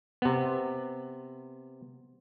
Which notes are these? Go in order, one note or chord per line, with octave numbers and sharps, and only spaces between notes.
C3 B3